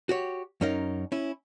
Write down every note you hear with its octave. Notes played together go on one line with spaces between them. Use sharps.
F#4 G4 C#5
F#2 C#4 D#4 A#4 F5
C#4 E4